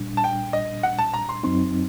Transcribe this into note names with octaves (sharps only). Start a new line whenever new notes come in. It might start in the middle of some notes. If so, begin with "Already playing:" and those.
Already playing: A#2 G3 D4
A5
G5
D#5
F#5
A5
A#5
C6
F#2 F#3 C4 D#4 C6